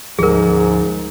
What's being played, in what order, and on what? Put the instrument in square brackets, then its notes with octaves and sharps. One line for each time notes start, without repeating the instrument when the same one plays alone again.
[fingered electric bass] D2 F3 G3 [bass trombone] G#2 [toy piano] G#4 A#4